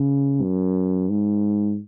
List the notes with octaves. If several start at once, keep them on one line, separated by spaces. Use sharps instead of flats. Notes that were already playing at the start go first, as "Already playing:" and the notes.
Already playing: C#3
F#2
G#2